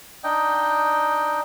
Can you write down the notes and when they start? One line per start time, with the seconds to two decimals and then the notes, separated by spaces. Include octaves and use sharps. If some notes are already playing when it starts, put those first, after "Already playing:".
0.24 D4 D#4 D#5 G5